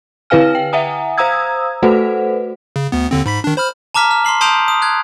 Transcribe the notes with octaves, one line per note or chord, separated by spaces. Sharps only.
D3 E4 B4 F5 G#5 F6
G5
E5 F#5 G#5 A#5 D#6
C5 F5 A#5 D#6 E6 G#6
A3 F#4 A4 B4 C5 F#5
C#3
D2 B3
D#2 D3 C4
G#2 B5 B6
D#3 D4
C5 B5 F6
A5 A#5 D6 F6 B6
F6
C6 F6 C7 F#7
A5 C6 D#6 G6 D7 F7
D#6
F#6 G#6